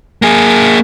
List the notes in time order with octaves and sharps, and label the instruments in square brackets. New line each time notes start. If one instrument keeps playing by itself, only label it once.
[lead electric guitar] A#3 G#4